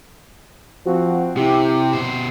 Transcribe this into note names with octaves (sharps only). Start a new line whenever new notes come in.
F3 C4 F#4
C3 E4 G4
B2 C5